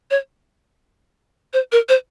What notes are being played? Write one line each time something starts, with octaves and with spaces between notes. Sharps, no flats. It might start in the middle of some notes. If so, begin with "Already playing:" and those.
C#5
C5
A#4
C5